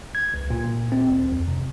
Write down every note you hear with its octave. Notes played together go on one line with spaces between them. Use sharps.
G#6
C#2
A#2
C4
D2
F2
C3